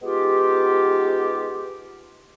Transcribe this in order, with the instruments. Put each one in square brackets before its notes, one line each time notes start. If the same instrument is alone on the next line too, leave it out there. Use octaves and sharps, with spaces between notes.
[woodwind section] G#3 B3 D#4 F4 G4